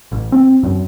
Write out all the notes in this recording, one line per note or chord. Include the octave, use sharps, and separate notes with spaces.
A1
C4
F#2